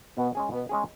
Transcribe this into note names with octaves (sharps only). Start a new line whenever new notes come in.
B2 B3
G#3 C#4 G#4
B2 B3
G#3 C#4 G#4